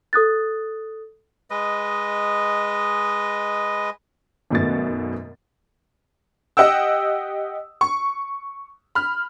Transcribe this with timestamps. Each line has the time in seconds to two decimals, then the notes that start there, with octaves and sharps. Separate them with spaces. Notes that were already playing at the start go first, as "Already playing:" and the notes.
0.13 A4 D#6 F#6 A6
1.50 G#3 B4 D#5
4.50 G#1 F#2 B2 A3 B3 A6
6.57 G4 D#5 F#5 G5 E6
7.81 C#6
8.95 B5 F6